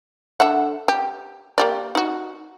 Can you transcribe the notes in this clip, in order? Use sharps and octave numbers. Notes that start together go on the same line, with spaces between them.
D3 E5 F#5
G4
A#3 G4 D5
D#4 F#4